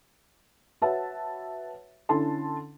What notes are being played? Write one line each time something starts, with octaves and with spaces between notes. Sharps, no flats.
F#4 B4 C#5 E5 F#5 A5
D3 C#4 E4 A4 A5 C6